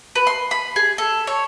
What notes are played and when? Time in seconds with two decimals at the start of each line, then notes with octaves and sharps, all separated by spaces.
0.15 B4
0.27 C6
0.51 B5
0.76 G#4
0.98 A4
1.27 C#5